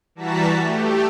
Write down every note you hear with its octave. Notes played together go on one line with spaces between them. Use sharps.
E3 G3 F#4 A5 A#5 B6
A3 G4